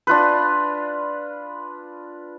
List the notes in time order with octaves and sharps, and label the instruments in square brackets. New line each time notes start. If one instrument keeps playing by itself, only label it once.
[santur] D4 F4 B4